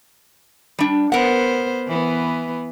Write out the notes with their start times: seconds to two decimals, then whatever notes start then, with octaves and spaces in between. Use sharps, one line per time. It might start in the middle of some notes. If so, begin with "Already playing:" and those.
0.79 G3 D4
1.12 B3 A#4 C5 F#5
1.88 E3 B3